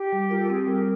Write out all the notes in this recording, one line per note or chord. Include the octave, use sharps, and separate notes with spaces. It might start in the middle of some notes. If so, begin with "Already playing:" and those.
Already playing: G4
G3
F4 A#4
A4
C4 G#4
G3 A#4